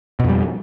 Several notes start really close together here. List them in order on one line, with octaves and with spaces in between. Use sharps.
B2 F2 G3